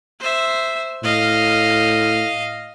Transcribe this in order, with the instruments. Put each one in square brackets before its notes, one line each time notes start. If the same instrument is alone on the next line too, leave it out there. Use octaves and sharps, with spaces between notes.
[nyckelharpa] C5 E5
[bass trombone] A2 [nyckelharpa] D#5 F5